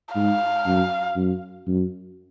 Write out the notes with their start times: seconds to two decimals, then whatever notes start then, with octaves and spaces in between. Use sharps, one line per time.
0.15 G#2 F5
0.66 F#2
1.16 F#2
1.68 F#2